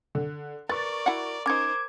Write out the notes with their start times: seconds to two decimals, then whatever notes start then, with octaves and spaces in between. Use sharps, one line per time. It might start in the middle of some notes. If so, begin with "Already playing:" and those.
0.15 D3
0.69 A#4 B4 D5 C#6 A6
1.06 E4 F#4 F#5
1.46 C#4 D#4 A#4 C5 D6 G#6